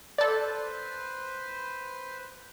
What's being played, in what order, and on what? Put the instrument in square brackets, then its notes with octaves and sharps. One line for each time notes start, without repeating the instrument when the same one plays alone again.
[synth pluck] A4 D5 [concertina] B4 C5